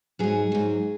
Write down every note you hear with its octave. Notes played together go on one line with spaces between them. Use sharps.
G#2 F#3 G#4
G#2 F#3